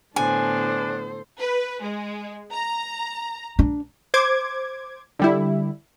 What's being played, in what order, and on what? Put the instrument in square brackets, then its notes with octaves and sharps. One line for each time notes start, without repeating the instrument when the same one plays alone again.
[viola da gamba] A2 D3 B3 [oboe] D4 [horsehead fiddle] A4 C5 [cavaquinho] G#5
[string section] B4
G#3
A#5
[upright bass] D4
[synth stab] C5 D6 G#6
D3 G3 E4